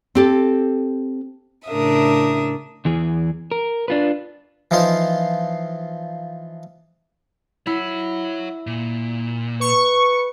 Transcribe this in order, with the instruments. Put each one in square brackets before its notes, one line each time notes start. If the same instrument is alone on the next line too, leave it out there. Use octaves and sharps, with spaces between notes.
[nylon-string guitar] C4 G4 A4
[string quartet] A2 C#3 D4 A#4 E5 D#6
[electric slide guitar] E2 E3 G#4
A#4
D4 F4 B4
[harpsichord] E3 F3 D#4 F4 C5 C6
[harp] E4 [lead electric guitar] C#5 F#5
[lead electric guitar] A#2
[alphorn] B4 [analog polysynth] C#6